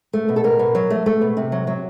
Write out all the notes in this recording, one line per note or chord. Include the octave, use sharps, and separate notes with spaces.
A3
B2
A4
B2 A#4
B2
F#3
A3
A3
B2
C3
F#3
F#3